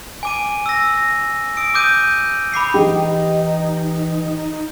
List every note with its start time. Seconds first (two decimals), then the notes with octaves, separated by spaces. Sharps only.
0.23 G#5 D6 D#7
0.66 E6 A#6
0.98 A#6
1.57 D#6 E6 D7
1.74 D6 D#6 G6 D#7
2.52 B5 D6 C7 C#7
2.74 E3 D#4 G4